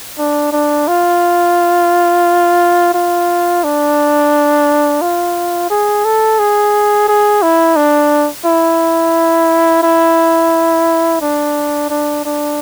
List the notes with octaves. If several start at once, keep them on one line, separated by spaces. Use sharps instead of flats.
D4
D4
F4
F4
D4
F4
G#4
A4
G#4
G#4
E4
D4
E4
E4
D4
D4
D4